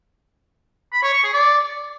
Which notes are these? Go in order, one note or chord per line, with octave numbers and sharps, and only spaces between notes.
B5
C#5
C#6
G#4
D5